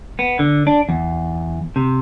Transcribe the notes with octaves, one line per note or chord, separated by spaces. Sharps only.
B3
D3
D4
E2
C3